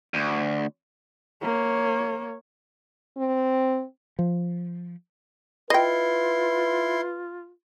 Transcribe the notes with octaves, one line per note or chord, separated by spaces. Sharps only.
D2
A#3 C#5
C4
F3
E4 F4 B4 D#5 G5 C6